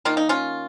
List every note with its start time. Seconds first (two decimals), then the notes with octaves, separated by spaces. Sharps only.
0.05 D#3 A#3 F4
0.17 D#4
0.29 C#4 F4